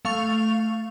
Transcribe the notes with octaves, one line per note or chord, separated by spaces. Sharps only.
A3 F5 C#6 F7